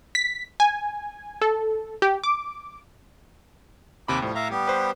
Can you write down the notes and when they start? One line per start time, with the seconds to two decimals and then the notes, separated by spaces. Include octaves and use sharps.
0.15 B6
0.60 G#5
1.41 A4
2.02 G4
2.24 D6
4.08 D#2 C3 B5 D6
4.22 A2 F3 G3
4.35 E5 F5 A#5
4.50 G3 B3 G4
4.68 B4 C5